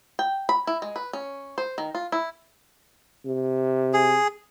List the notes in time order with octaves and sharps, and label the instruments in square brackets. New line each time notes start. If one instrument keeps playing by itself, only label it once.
[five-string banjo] G5
B5
E4
G#3
B4
C#4
C5
D#3
F4
E4
[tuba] C3
[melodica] G#4